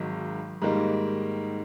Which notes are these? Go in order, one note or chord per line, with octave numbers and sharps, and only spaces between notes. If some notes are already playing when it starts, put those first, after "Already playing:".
Already playing: G#1 G#2 D#3 F#3
G#2 D#3 G3 A#3 D#4